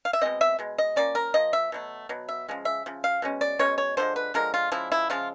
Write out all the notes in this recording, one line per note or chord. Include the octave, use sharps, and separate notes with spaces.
F5
E5
B2 G#3 C4 D#5
E5
B2 G#3
D#5
F3 A#3 C#4 D5
A#4
F3 A#3 D#5
E5
B2 F#3 A3
B2 F#3
E5
C#3 F3 G#3
E5
C#3 F3
F5
B2 G#3 C#4
D5
B2 G#3 C#4 C#5
C#5
D3 F3 G#3 C5
B4
D3 F3 G#3 A#4
F4
C#3 F3 G#3 E4
E4
C#3 F3 G#3 F4